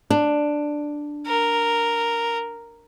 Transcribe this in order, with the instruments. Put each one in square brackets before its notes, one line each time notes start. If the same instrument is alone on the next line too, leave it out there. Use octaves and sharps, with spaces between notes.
[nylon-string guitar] D4
[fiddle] A#4